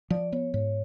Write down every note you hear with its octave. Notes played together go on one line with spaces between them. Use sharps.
F3 D5
B3 C#5
G#2 C#5